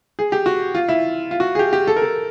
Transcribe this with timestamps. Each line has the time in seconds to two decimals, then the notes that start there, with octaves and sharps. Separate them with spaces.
0.19 G#4
0.32 G4
0.46 F#4
0.75 F4
0.89 E4
1.31 F4
1.40 F#4
1.55 G#4
1.59 G4
1.73 G4
1.87 A4
1.96 A#4
2.02 A4